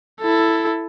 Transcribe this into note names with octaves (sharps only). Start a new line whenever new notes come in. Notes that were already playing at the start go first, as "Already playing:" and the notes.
E4 A4